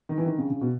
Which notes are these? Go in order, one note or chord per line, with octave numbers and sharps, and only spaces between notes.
D#3
E3
D#3
C#3
C#3
B2